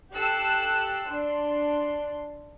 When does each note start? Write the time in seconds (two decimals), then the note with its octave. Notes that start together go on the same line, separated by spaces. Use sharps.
0.13 G4 A4 E6 F#6 C7
1.07 D4 C6